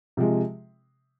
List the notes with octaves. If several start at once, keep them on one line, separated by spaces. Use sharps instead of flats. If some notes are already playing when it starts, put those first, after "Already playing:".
C3 F3 G#3